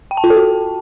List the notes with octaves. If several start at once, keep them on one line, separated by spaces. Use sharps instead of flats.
G5
A5
F4
A4
F#4